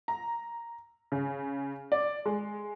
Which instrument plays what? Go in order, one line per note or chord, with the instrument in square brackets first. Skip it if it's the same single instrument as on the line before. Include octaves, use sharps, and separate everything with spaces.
[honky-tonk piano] A#5
C#3
D5
G#3